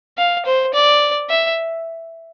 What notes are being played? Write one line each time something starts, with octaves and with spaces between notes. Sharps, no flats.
F5
C5
D5
E5